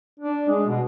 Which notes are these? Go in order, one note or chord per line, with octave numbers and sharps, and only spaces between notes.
D4
G#3
B2